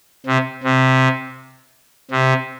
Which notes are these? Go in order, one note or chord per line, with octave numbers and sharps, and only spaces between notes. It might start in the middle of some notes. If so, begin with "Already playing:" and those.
C3
C3
C3